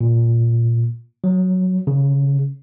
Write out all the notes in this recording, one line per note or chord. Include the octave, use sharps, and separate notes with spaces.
A#2
F#3
C#3